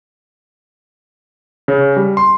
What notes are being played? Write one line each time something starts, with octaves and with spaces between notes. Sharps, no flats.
C#3
G3
C6